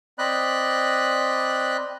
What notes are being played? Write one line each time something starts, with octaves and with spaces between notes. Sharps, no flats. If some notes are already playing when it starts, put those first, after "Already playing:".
C4 D5 D#5 B5 F#6